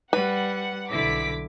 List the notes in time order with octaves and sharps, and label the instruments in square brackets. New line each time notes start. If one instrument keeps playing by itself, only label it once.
[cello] G3 [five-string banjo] B4 [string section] F#5
[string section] B1 D6 B6 [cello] D3 E4